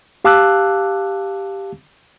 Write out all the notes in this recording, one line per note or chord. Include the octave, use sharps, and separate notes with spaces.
G4 F5 A5 D6 E6 F#6